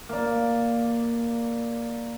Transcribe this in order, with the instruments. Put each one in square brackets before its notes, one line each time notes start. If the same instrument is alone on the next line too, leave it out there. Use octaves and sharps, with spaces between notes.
[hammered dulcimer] A#3 D5